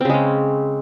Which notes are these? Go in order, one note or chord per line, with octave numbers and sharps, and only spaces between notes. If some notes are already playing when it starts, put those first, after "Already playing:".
C#3 G#3 C4 C#4